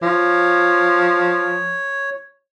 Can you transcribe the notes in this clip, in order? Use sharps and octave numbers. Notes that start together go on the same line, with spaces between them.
F3 C#5